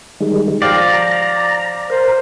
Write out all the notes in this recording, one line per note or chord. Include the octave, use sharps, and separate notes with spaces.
D#3 G3 G#3
F3 D5 F5 G5 A#5
A#4 C5